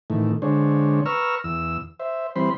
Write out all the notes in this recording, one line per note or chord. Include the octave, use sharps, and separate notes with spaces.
A2 D#3 E3 A3
D3 G#3 D4 C5 C#5
B4 A#5 C#6 E6 F6
E2 E6
C5 E5
E3 G3 C4 C5 B5 C6